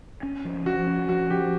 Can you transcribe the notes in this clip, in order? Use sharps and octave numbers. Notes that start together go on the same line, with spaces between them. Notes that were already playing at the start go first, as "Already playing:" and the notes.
C#4
F3
F3 F#4
C#4
F3 F#4
F3 G4